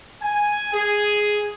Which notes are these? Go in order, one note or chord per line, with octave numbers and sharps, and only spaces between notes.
G#5
G#4